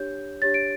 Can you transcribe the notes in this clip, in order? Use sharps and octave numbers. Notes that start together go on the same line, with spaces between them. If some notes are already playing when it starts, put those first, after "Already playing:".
Already playing: D4 G4 C#5 G6
D4 G4 C#5 A6
D7